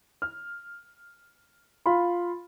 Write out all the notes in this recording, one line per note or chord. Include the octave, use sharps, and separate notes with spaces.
F6
F4 F5 B5 C6